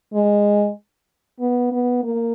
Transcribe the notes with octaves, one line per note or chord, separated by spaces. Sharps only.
G#3
B3
B3
A#3